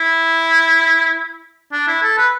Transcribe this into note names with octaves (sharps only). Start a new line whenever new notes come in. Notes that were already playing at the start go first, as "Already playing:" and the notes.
Already playing: E4
D4
E4
A4
B4